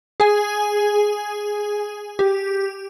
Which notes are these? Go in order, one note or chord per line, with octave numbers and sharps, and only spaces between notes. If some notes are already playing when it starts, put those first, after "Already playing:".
G#4 G#5
G4